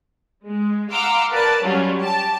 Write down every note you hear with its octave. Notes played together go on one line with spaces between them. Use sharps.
G#3
F5 F#5 A#5 C6 D6 E6
A#4 B4 D5 A5
F#3 G3 C#4 F4
G4 A5